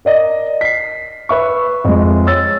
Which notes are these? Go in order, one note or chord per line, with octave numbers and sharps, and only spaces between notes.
A#4 D5 D#5
B6 C7
B4 E5 C#6
F2 G#3
C#5 E6 A6